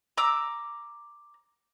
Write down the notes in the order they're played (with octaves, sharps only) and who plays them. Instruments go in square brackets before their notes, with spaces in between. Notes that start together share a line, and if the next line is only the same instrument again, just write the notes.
[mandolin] A#5 D6 E6